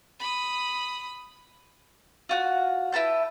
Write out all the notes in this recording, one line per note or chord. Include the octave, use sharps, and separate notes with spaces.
B5 D#6
F4 F#4 F#5
E4 B4 A5 G6